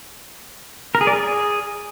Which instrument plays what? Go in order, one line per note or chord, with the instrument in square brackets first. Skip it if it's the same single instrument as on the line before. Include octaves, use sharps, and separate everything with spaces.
[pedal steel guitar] A#4
G#4
D5
G#4